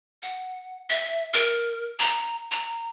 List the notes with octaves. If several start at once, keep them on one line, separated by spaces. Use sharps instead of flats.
F#5
E5
A#4
A#5
A#5